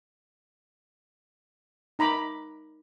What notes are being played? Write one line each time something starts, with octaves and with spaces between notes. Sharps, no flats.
D#4 A#5 B5 D6